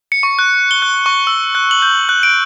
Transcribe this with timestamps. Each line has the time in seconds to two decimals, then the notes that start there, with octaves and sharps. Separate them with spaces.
0.12 C#7
0.23 C#6
0.39 F#6
0.71 G7
0.82 F#6
1.06 C#6
1.27 E6
1.55 F#6
1.71 F#7
1.82 G6
2.09 F#6
2.23 D7